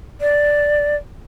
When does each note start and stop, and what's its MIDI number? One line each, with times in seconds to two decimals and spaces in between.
0.21 0.96 74